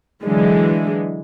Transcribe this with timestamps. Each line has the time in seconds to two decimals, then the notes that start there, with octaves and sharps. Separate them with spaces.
0.24 D3 E3 F#3 G#3